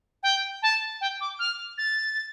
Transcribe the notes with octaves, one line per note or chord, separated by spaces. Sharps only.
G5
A5
G5
D6
F6
A6